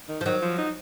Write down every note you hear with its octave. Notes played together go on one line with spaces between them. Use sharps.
D#3
F3
D#3 F#3
F3
D#4